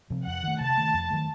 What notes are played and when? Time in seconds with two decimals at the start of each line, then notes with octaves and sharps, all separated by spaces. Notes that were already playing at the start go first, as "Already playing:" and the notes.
0.10 C3 F3 C4
0.26 F2 F#5
0.43 D#3 A3
0.60 C3 A5
0.77 D#3 A3
0.94 F2
1.10 D#3 F#3 A3